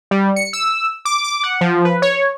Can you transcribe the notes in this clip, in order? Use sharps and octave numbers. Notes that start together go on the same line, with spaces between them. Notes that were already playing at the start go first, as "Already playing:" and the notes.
G3
C#7
E6
D6
D6
F#5
F3
B4
C#5